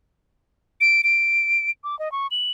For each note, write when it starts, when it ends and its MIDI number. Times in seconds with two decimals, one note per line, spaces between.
0.81 1.02 98
1.04 1.70 98
1.84 1.98 86
1.99 2.11 75
2.12 2.27 85
2.31 2.52 102